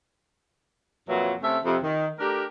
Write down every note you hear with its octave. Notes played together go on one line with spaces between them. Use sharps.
F2 A#2 E3 F#3
C3 A3 C#4 A4 E5
F2 C3
D#3
A3 D4 G4 A#4